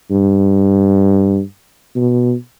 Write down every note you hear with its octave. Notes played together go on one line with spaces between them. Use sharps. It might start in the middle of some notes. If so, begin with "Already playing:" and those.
G2
B2